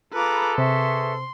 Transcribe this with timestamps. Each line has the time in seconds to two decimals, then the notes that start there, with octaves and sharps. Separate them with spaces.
0.13 F4 G#4 A4 B4 A#5 B5 D6
0.58 C3 B4 E5 C6 C#6